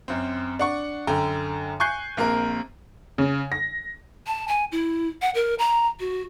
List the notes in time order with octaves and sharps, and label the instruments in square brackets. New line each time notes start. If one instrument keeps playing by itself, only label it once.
[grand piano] F#2 C4
D4 F#5 C#6
F#2 D3 G5 A#5
G#5 C#6 F#6 G6 C7
A#1 A#3 C4 A#4
[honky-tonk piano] C#3
A#6
[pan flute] A5
G#5
E4
F#5
A#4
A#5
F#4